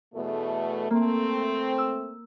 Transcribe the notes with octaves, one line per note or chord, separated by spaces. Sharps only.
E2 B2 A3
A3 A#3 C4
E6